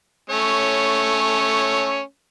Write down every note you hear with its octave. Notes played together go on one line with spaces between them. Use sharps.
A3 C#4 C#5